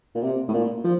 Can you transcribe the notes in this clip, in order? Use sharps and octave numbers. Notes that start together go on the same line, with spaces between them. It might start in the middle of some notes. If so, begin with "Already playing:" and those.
A#2
C3
A2
A#2
F3